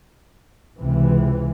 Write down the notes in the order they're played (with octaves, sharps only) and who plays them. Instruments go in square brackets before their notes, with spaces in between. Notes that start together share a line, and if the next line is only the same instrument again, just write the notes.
[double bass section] C#2 C3 E3